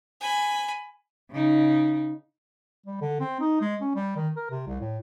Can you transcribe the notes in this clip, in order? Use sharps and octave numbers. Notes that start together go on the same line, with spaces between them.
G#5 B5
C#3 D#4
G3
D3
C4
D#4
G#3
C#4
G3
D#3
A#4
C3
C2
A2